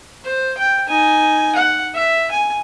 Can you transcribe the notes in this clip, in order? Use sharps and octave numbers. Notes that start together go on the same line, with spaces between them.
C5
G5
D#4 G#5
F#5
E5
G#5